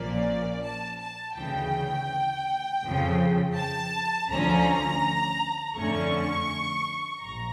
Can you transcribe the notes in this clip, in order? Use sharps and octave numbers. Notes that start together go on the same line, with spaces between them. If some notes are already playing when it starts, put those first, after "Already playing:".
Already playing: A#1 A#2 F3 A#3 C#4 D5
A5
A5
D2 C#3 E3 G5
F2 C#3 F3
A5
D2 D3 F3 C#4 A#5
F2 D3 A3 C#4 C#6
A#1 A#5